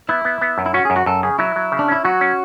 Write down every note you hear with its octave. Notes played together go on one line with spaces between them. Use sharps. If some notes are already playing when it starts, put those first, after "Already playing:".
B3 E4
B3
B3
F#2
E4
C#4 F#4
F#2 G#4
F#4
F#2 A4
C#3 G#4
F#3 E4
F#3
C#3
D4
C#4 E4
F#3 F#4
C#4